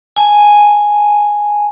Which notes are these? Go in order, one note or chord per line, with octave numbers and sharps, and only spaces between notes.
G#5 A5